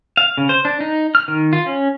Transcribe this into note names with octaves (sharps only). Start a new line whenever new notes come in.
F5
C#3
C5
D4
D#4
F6
D#3
F4
C#4